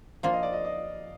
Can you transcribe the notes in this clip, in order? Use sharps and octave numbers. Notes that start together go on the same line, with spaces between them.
F3 A#3 D4 F4 F5
D#5
D5
D#5
D#5